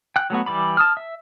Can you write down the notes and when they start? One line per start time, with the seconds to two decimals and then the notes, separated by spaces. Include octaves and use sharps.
0.16 G5 F#6
0.30 F#3 A3 B3 F#4
0.46 E3 G3 D5 B5
0.77 A5 D#6 F6
0.97 E5